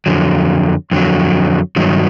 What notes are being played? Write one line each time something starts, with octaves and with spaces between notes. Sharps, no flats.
F2 D3 F#3
F2 D3 F#3
G2 D#3 F#3